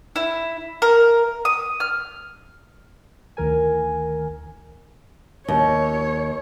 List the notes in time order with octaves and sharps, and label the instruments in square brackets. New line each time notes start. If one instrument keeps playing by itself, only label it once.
[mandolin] E4
A#4
D#6
F6
[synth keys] D2 D#3 A#4 G#5
[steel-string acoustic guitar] D#2 [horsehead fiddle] C#5